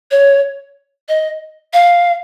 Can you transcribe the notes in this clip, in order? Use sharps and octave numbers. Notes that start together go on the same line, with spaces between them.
C#5
D#5
F5